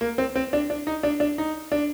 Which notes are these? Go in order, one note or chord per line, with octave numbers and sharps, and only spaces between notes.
A#3
C4
C4
D4
D4
D#4
D4
D4
D#4
D4